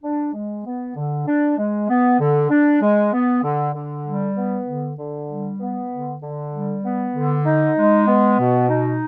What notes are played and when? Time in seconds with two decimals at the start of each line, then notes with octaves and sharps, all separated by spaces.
0.03 D4
0.34 G#3
0.65 B3
0.96 D3
1.27 D4
1.58 G#3
1.89 B3
2.20 D3
2.50 D4
2.82 G#3
3.13 B3
3.43 D3
3.74 D3
4.06 G3
4.36 B3
4.67 D3
4.98 D3
5.29 G3
5.60 B3
5.91 D3
6.22 D3
6.53 G3
6.84 B3
7.14 D3
7.45 D#4
7.77 G#3
8.08 B3
8.38 B2
8.70 D#4